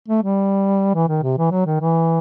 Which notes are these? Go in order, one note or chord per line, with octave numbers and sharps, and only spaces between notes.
A3
G3
E3
D#3
C3
E3
F#3
D#3
E3